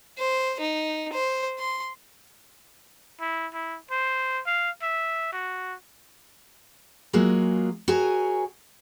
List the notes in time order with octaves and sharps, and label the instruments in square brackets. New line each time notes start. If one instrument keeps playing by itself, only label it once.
[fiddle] C5
D#4
C5
C6
[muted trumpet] E4
E4
C5
F5
E5
F#4
[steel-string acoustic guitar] F#3 G#3 A#3 F4 F#4 G#4
F#4 G#4 A#4 C#5 G#5